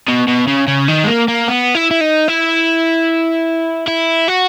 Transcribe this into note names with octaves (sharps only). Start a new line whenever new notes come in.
B2
B2
C#3
C#3
D#3
G#3
A#3
A#3
B3
E4
E4
D#4
E4
E4
F#4